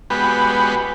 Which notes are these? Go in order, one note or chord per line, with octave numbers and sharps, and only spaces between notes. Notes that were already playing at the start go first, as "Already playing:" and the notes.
G#3 B3 F#4 G4 B4